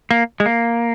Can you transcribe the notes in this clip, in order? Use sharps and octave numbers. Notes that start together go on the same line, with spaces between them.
A#3
G#3
A#3